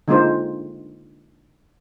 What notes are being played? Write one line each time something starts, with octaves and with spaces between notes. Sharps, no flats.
D3 G#3 A#3 D#4 F4 C5